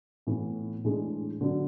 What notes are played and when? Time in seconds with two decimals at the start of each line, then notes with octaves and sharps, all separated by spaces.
0.27 A2 E3 B3
0.84 A2 E3 G#3 D4
1.41 D3 F#3 B3 D4 F#4